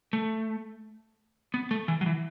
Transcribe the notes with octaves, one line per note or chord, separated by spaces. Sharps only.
A3
B3
A3
E3
F#3
E3